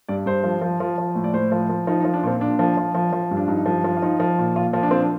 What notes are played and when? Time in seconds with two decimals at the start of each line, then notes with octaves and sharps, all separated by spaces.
0.09 G2 D5
0.26 G2 C5
0.44 F3
0.62 F3
0.80 F3
0.98 F3
1.15 A2
1.24 D5
1.33 A2 C5
1.52 F3
1.69 F3
1.87 F3 D#4
2.00 D#4
2.05 F3
2.14 D4
2.23 A#2 C4
2.41 A#2 D4
2.59 F3
2.77 F3
2.95 F3
3.13 F3
3.31 G2
3.37 D4
3.48 G2 D#4
3.66 F3
3.84 F3
3.97 F4
4.02 F3 D#4
4.20 F3
4.38 A#2
4.56 A#2 F4
4.73 F3
4.83 D4
4.91 F3 C4
5.00 D4